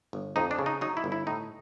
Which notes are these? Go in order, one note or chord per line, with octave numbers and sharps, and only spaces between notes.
G1
F2 D#4
D4
C#3
D#4
F#3 D#4
E4
G1
E4
A2 D#4